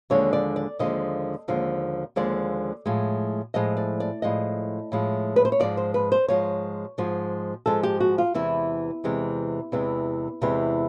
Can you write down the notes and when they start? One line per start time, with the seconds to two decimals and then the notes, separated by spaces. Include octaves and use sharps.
0.10 D#2 D3 F3 G#3 C#5
0.33 D5
0.56 D5
0.79 D#2 D3 F3 G#3 D#5
1.48 D#2 D3 F3 G#3
2.16 D#2 D3 F3 G#3 D5
2.86 A2 F3 G#3
3.54 A2 F3 G#3 D#5
3.77 D5
4.00 D5
4.22 A2 F3 G#3 D#5
4.92 A2 F3 G#3
5.36 B4
5.45 C5
5.52 C#5
5.60 G#2 F3 G#3 D5
5.77 C5
5.94 B4
6.12 C5
6.28 G#2 F3 G#3 C#5
6.98 G#2 F3 G#3
7.66 G#2 F3 G#3 A4
7.83 G4
8.00 F#4
8.18 F4
8.34 E2 C3 E3 G#3 E4
9.04 E2 C3 E3 G#3
9.72 E2 C3 E3 G#3
10.41 E2 C3 E3 G#3